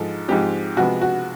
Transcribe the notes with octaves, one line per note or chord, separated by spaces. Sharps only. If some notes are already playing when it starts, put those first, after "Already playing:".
Already playing: G#2 F3 G#3 A4
G#2 F3 G#3 C4 G4
C3 F3 G#3 B3 F#4
F#4